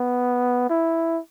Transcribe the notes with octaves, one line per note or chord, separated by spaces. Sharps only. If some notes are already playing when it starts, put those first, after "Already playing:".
Already playing: B3
E4